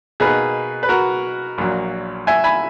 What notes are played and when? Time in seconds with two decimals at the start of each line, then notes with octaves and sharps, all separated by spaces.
0.20 B2 A#3 D#4 G#4 B4
0.83 B4
0.89 F#4 A#4
1.58 A#1 A#2 F#3
2.27 E5 G#5
2.44 G#5 B5